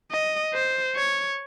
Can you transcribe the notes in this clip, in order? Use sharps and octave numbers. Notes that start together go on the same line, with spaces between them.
D#5
C5
C#5